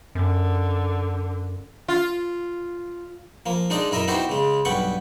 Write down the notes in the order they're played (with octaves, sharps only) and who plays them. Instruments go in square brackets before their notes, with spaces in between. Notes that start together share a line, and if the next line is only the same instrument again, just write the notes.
[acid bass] F#2 [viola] D3
[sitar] F4
[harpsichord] F3 A#3
G#3 D4 D#4 G#4 D5 D#5
F#2 E4 A#4 D#5 E5
B3 D#4 E4 F#4 G4 C5
C#3 G#3
B1 G2 B3 F#5 G5 C#6